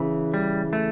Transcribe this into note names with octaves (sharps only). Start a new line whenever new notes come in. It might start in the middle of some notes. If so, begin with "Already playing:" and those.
Already playing: C#3 E3
G3
A3